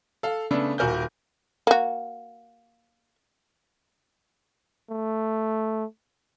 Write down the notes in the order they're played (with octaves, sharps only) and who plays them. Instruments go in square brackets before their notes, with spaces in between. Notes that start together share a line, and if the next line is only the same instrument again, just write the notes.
[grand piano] A4 F5
C#3 A3 B3 D4 A4
D#1 F#4 A#4 G#5 G6
[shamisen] A#3 F#4
[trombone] A3